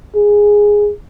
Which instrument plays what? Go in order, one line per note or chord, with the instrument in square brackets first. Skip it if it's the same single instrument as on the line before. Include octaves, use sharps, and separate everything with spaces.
[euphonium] G#4